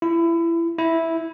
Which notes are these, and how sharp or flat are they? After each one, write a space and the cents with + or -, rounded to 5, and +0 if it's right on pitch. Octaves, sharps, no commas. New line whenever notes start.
E4 +25
E4 -5